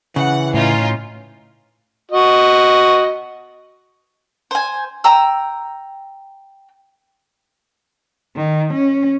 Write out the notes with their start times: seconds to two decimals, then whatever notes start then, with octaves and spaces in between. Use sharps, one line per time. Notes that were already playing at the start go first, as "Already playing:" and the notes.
0.16 C#3 E3 F#5
0.54 A2 C#4 D#4 F4
2.11 F#4 D#5
4.51 C5 G#5
5.04 G5 A#5 E6
8.36 D#3
8.74 C#4